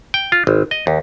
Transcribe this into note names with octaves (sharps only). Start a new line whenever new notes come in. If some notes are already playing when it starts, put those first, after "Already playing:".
G5
F4
G#1
D#5
D#2